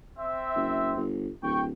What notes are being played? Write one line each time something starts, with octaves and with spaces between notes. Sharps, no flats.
C4 E5
F#1
G1
D1 G5 C#6